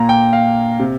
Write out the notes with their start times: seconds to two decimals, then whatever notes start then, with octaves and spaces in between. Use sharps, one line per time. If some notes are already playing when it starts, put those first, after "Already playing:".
Already playing: A#2 A#3 A#5
0.09 G5
0.33 F5
0.80 C3